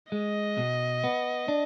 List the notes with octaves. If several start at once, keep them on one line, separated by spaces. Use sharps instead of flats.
G#3 D#5
B2
B3
D4